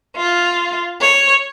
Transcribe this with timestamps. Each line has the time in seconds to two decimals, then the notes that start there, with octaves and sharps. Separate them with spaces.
0.16 F4
1.01 C#5